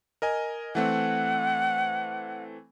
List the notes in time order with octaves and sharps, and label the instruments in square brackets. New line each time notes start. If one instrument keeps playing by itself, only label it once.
[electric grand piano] A#4 D#5 G#5
[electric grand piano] E3 A3 C4 [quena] F#5